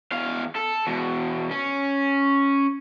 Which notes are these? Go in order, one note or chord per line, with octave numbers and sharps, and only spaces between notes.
E2 F5
A4
E2 B2
C#4